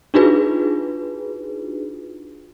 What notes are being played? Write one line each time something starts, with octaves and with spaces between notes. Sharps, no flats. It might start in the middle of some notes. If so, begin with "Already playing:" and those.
D4 D#4 F4 F#4 G#4 B4